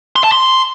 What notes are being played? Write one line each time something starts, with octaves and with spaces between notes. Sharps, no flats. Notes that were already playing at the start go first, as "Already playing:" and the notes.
C6
A5
C6